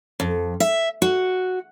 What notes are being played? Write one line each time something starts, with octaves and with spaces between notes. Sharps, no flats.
F2
E5
F#4